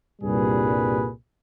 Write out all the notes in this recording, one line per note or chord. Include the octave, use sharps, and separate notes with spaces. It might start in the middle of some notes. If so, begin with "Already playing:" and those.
C2 G2 A#2 G3 G#4 B4